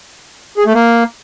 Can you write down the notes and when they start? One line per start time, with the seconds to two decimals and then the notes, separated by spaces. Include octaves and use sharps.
0.57 G#4
0.66 A3
0.74 A#3